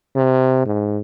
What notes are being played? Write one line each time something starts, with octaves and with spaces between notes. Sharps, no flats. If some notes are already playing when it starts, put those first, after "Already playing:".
C3
G#2